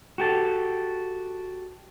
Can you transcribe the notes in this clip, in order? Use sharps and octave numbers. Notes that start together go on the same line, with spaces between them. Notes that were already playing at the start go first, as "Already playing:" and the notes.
F#4 G4 A4